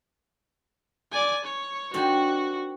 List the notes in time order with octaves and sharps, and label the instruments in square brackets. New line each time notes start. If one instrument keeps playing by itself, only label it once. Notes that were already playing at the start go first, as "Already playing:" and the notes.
[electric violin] D5 G#5
C#5
[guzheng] D#3 C4 D4 [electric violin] F#4